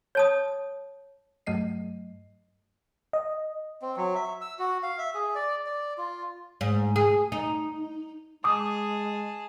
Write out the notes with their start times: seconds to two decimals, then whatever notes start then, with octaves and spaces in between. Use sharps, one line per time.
0.15 C#5 A5 D#6
1.47 G2 F#3 A3 D#5 C7
3.13 D#5
3.82 C4
3.97 F#3
4.15 E5
4.41 E6
4.59 F#4
4.83 F5
4.99 E5
5.15 G#4
5.35 D5
5.66 D5
5.98 F4
6.61 G#2
6.96 G#4
7.32 D#4
8.44 G#3 G#4 A5 D6 D#6